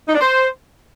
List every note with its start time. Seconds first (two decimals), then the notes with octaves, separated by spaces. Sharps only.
0.08 D#4
0.15 D4
0.21 C5